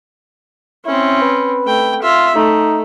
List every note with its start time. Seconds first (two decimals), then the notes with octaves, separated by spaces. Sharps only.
0.85 C4 C#4 E4
1.21 B4
1.65 A3 G5
2.01 F4 E5
2.35 A3 D#4